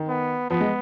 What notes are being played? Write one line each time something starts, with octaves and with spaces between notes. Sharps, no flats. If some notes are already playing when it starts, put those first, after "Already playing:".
Already playing: D#3
B3
F3 B3
G#3